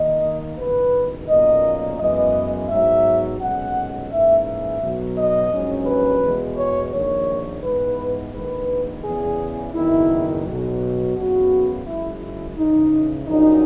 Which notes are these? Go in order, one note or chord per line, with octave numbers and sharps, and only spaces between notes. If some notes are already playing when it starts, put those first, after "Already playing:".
Already playing: D#2 D#3 A#3 D#5
F#1 E2 D#3 B4
B1 A#2 A#3 C#4 D#5
F#2 E3 G#3 B3 D#5
G#2 F#3 B3 E5
B1 A#2 G#3 C#4 F#5
G#2 E3 A#3 C#4 E5
E5
B1 B2 F#3
D#5
A#1 G#2 F#3 C#4
B4
E2 B2 G#3
C#5
A#1 G#2 D#3 A#3 C#5
G#2 E3 G#3 B3 B4
A#1 G#2 D#3 A#3 B4
E2 C#3 E3 G#4
F#1 E2 D#3 E4
B1 B2 F#3
F#1 F#2 C#3 E3 B3 F#4
F#1 F#2 C#3 G#3 E4
E4
C#2 C#3 E3 D#4
A#1 A#2 F#3 C#4 D#4